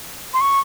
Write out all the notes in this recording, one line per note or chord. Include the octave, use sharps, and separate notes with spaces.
C6
C#6